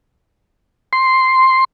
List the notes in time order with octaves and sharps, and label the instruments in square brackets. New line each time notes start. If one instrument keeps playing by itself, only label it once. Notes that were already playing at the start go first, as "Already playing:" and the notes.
[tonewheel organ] C6